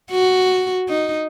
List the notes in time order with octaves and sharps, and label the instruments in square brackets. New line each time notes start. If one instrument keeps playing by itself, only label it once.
[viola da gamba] F#4
D#4